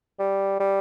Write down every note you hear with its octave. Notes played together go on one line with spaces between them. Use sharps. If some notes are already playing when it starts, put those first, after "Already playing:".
G3
G3